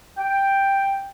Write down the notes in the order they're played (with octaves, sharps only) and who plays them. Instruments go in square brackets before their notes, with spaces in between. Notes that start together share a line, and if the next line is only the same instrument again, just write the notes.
[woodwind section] G5